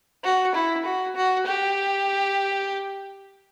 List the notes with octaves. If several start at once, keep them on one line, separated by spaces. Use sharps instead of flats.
F#4
E4
F#4
F#4
G4